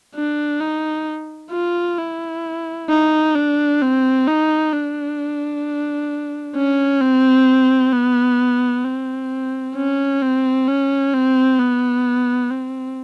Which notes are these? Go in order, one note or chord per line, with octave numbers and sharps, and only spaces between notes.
D4
D#4
F4
E4
D#4
D4
C4
D#4
D4
C#4
C4
B3
C4
C#4
C4
C#4
C4
B3
C4